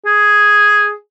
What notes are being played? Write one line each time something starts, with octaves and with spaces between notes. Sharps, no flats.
G#4